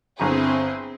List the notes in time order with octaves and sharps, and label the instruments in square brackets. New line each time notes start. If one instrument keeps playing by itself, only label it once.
[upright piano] G1 A#5 [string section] C4 E4 G#4